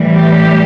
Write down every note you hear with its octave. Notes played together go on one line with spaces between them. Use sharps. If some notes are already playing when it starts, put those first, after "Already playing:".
Already playing: A2 E3 G3
G4